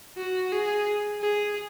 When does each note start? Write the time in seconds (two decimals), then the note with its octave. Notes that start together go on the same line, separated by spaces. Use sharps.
0.18 F#4
0.52 G#4
1.21 G#4